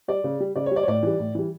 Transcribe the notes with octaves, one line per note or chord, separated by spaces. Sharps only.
G3 D5
C#3
G3
C#3 D5
C#5
G3 D5
C#5
A2 D5
E3 G3
A2
E3 G3